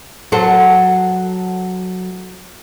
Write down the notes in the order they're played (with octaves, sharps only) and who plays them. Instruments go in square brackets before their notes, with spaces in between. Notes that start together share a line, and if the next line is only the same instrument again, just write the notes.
[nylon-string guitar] F#3 A4 C5 F#5